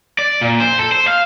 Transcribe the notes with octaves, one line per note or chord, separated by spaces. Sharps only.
D5
A#2
C5
A4
C5
F5